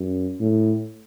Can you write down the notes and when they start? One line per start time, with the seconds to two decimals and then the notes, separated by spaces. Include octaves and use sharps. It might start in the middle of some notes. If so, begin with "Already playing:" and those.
Already playing: F#2
0.40 A2